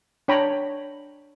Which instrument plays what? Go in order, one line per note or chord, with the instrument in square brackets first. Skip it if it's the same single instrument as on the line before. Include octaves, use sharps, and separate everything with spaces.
[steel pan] D4 C#5 G5 A#5 B5